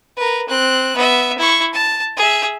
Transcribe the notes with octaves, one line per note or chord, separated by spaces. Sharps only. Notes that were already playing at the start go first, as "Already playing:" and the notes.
A#4 B4
C4 F#6
B3 E5
E4 C#6
A5
G#4 E5